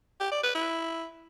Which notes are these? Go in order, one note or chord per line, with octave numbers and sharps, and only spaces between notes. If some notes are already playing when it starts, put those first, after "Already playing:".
G4
D5
B4
E4